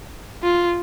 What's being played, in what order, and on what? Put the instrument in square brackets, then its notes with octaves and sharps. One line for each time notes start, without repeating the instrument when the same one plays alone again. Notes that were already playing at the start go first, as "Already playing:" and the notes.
[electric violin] F4